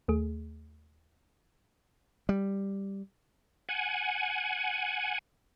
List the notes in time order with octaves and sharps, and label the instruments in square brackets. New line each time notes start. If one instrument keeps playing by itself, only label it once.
[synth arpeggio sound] D#2 A3 G#4
[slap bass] G3
[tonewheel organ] F#5 G#5